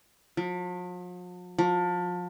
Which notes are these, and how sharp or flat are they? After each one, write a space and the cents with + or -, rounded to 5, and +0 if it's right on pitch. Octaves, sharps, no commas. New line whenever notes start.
F3 +45
F3 +30